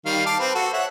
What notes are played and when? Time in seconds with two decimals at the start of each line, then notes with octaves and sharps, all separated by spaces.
0.06 D#3 G3 F5
0.26 F5 A5 D6
0.40 C4 B4
0.55 F#4 A4
0.74 C#5 E5 F#5